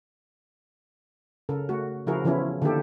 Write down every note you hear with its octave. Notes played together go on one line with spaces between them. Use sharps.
C#3 A4 A#4
A3 F#4
C#3 F3 E4 F#4 G#4 A#4
C#3 E3 F3 B3 C#4 E4
D3 D#3 A#3 E4 G4 A4